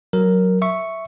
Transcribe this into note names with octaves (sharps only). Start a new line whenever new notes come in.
F#3 A#4
E5 C#6